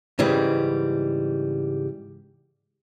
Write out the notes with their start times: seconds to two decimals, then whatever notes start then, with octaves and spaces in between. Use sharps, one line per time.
0.19 G#2 C#3 E3 G3